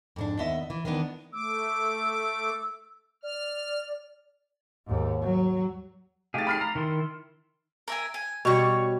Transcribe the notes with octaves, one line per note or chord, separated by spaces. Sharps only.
F2 G#2 D4
D#2 B3 D#5 E5
E3
D#3 E3 B3 D4
A3 D6 E6
D5 F6
D#2 G#2
F#3
A3 G4 G#4 F5 A6
B5 F6 C7
A#5
D#3 E4 C6
A#4 E5 G#5
G#5
B2 G3 C#5 C#6